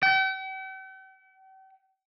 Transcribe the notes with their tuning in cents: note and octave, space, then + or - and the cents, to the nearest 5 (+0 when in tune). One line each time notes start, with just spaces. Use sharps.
G5 -45